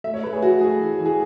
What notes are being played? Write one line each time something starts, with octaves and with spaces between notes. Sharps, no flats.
A3 E5
C#5
A3 B4
G#4
A3 F#4
A3 G#4
E3
E3
G#4